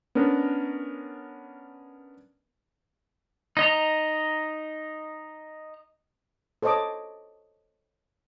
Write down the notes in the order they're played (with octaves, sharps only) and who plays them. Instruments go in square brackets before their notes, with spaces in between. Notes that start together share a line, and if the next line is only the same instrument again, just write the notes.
[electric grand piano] B3 C#4 D4 A#4
[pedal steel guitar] D#4 D#5 A#5
[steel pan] A4 C5 C#5 D#5 A5 D6